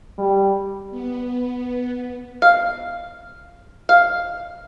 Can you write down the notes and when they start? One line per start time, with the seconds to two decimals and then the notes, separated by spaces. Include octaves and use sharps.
0.18 G3
0.90 B3
2.42 F5
3.89 F5